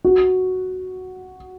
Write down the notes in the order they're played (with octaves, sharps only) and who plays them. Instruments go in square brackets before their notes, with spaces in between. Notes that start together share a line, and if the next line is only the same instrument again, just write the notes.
[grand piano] F#4